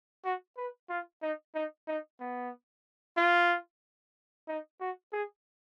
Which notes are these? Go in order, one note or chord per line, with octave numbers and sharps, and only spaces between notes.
F#4
B4
F4
D#4
D#4
D#4
B3
F4
D#4
F#4
G#4